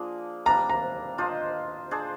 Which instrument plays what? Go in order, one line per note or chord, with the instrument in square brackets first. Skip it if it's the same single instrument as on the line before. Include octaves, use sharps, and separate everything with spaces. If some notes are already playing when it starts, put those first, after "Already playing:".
Already playing: [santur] F3 A#3 D4 G#4
[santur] G3 A#3 D4 [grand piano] A#5
[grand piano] A#5
[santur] D4 F4 C5 D#5
D4 G#4 C5